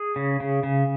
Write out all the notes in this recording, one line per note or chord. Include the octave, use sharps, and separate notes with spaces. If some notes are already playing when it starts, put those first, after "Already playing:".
Already playing: G#4
C#3
C#3
C#3